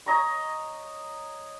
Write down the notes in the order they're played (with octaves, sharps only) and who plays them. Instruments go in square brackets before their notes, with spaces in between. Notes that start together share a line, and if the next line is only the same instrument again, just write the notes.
[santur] C#5 D#5 A#5 C#6